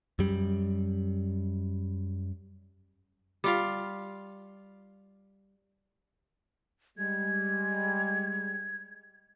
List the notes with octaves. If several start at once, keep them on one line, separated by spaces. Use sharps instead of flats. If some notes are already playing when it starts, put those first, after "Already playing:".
F#2 G3
G3 F4 F5
G3 G#3 G#6